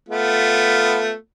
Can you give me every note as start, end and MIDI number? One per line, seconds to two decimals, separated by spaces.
0.09 1.13 57
0.09 1.13 59
0.09 1.13 65